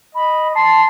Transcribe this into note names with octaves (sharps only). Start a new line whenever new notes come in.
D#5 B5
A5 C6 C7